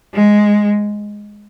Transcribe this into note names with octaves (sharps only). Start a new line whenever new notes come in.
G#3